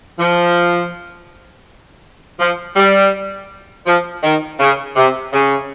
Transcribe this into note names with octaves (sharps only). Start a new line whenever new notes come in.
F3
F3
G3
F3
D#3
C#3
C3
C#3